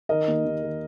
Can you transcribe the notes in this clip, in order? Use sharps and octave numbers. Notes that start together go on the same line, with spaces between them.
D#3 A#4 D#5
D#2
D#2
D#3